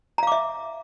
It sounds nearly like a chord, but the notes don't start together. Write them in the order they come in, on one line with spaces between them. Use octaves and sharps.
A#5 F5 D6 E5